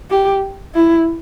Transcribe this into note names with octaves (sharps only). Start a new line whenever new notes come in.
G4
E4